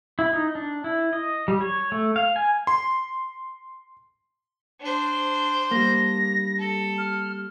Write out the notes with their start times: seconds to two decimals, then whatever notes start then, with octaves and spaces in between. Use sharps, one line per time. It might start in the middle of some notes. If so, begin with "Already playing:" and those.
0.19 E4
0.33 D#4
0.55 D4
0.84 E4
1.13 D#5
1.48 G3
1.61 C#5
1.92 A3
2.16 F5
2.36 G#5
2.67 C6
4.81 D4 C5
5.71 G3 A#3 A#6
6.59 A4
6.98 F6